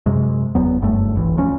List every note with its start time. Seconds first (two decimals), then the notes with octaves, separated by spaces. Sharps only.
0.06 F#2 C3 G#3
0.55 F#1 E2 F#3 B3
0.82 F#1 G2 A3
1.15 E1 A1 E3
1.38 D2 F3 C#4